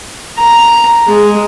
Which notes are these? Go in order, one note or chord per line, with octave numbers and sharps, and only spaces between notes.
A#5
G#3